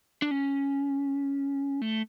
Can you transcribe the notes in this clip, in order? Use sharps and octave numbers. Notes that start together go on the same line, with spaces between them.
D4
C#4
A3